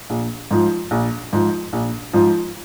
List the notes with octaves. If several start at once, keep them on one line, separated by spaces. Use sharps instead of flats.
A#1
G#2 F3
A#1
G#2 F3
A#1
G#2 F3